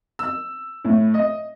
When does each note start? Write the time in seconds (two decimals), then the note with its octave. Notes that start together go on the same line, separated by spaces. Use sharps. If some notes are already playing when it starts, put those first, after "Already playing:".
0.19 E6
0.85 A2
1.14 D#5